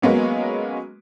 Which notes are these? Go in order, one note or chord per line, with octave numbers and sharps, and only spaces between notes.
F#3 G#3 A#3 B3 C#4